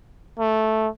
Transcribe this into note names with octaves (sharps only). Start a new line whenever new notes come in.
A3